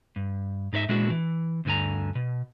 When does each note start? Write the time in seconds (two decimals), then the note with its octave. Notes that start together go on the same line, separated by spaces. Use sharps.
0.16 G2
0.73 G#2 D#4 B4 E5
0.89 A#2 G#3 D4 E4 F#4
1.10 E3
1.65 D2 G2 D3 G#5 A#5
2.15 B2